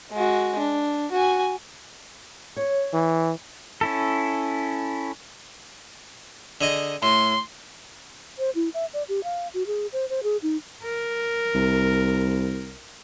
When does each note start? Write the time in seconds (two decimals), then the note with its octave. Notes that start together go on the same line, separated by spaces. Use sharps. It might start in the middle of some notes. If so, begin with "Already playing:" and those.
0.12 G#3 F#4
0.59 D4
1.12 F#4 G#5
2.57 C#5
2.93 E3
3.81 C#4 E4 A4
6.61 D3 G#4 D#5
7.03 A2 C6
8.39 C5
8.55 E4
8.74 E5
8.93 D5
9.08 G4
9.24 F5
9.54 F#4
9.67 G#4
9.92 C5
10.09 C5
10.23 G#4
10.42 D#4
10.84 A#4
11.55 C2